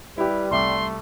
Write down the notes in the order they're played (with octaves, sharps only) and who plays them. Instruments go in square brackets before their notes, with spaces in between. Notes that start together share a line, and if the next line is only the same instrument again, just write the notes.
[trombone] G3 [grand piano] E4 G4 [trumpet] B4
[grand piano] C2 E5 D6 [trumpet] A3 [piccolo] C6